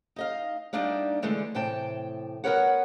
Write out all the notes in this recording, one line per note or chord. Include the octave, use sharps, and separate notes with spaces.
D#4 D#5 F5
G3 A#3 D4 D#4 D5 E5
D3 E3 G#3 A3 D4
A2 C3 E3 G5 A5
B3 F#4 A#4 B4 C#5 F#5